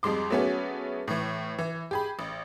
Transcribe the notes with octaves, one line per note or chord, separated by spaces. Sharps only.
F2 G3 G#3 C6 D6
F#3 A3 B3 C#4 G#4
A2 E3
E3
G4 G#4 B5
A1